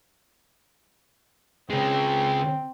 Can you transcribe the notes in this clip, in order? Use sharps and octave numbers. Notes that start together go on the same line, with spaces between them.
C#3 G#3 C4